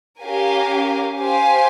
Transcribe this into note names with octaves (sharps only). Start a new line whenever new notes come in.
C#4 G4 A#4 F5 G#5
G4 C5 F5 G#5